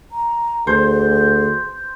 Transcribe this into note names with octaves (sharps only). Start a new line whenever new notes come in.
A#5
D2 G#4 C5